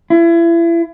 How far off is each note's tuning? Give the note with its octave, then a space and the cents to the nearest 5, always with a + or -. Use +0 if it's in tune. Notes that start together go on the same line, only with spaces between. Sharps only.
E4 +35